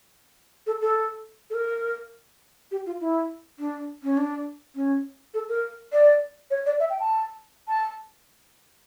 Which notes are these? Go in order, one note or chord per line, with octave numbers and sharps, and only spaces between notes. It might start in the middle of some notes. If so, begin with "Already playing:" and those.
A4
A4
A4
A#4
G4
F4
E4
D4
C#4
D4
C#4
A4
A#4
D5
C#5
D5
E5
G5
A5
A5